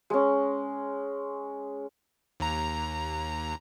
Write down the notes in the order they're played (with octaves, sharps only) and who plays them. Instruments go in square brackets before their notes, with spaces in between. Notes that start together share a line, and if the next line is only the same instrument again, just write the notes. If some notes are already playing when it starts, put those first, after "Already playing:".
[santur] G#3 C#4
[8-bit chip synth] D#2 A#5